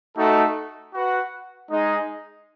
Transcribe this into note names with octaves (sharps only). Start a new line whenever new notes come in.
A3 D#4 F#4 A4
F#4 B4 F#5
G#3 D#4 G#4 D#5